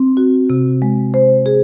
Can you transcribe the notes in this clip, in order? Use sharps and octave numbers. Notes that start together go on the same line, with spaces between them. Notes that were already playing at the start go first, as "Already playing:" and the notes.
Already playing: C4
F#4
C3
G#3
C5
G#4